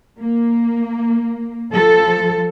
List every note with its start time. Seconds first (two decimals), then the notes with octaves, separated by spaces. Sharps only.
0.19 A#3
1.74 F3 A4